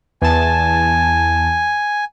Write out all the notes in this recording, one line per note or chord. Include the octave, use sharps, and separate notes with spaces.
E2 G#5 A5